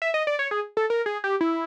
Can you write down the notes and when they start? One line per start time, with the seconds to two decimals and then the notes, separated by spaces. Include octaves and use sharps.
0.02 E5
0.14 D#5
0.27 D5
0.39 C#5
0.51 G#4
0.77 A4
0.90 A#4
1.06 G#4
1.24 G4
1.41 E4